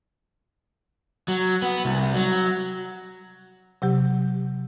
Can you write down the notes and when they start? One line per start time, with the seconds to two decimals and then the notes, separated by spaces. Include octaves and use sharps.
1.28 F#3
1.62 B3
1.85 C2
2.14 F#3
3.82 C3 F#3 G4